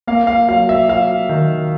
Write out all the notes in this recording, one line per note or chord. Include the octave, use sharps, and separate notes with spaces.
A#3 F5
F5
F#3 F5
E5
F#3 F5
D#3